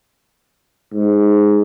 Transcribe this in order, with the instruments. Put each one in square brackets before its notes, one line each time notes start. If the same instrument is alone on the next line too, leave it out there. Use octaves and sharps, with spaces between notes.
[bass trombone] G#2